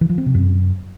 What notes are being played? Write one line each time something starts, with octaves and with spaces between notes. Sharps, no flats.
E3
F3
C4
C3
F#2